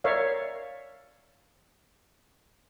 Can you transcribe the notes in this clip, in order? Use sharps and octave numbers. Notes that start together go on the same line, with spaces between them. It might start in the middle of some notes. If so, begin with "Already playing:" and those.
A#4 C#5 D5 E5 F5